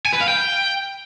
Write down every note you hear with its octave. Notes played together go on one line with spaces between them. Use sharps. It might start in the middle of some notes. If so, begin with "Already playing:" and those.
G#5
B4
F5
G5